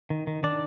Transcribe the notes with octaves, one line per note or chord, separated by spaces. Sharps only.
D#3
D#3
D#3 D4 D5